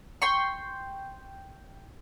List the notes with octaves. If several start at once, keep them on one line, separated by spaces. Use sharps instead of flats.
G5 C6 C#6